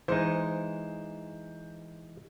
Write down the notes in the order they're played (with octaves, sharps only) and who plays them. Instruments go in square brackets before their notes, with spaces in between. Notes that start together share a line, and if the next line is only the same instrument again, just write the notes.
[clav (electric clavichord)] E3 G#3 D#4 [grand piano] C5